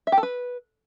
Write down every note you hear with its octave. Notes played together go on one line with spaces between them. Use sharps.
E5
G4
A4
B4